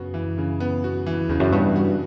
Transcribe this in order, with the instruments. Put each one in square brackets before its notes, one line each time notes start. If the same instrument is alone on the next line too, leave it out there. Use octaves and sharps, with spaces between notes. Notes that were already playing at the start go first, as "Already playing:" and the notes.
Already playing: [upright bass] F#2 [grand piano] C#3 B3 F#4
[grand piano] E3
C#3
B3
F#4
E3
[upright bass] E2 [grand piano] C#3
[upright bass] F#2
[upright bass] G2 [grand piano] B3
[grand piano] F#4